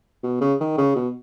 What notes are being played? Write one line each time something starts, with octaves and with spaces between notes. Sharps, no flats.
B2
C#3
D#3
C#3
B2